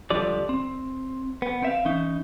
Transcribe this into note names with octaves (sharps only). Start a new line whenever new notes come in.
C#2 D3 F3 G3 D5
C4
B3
C4 E5 F5
E3 C#4 D#4